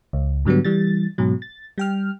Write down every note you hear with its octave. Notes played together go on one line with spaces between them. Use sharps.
C#2
G#2 D3 F#3 G3 B3
E3 G3 A6
G#2 B2 F#3
A6
G3 G5 F6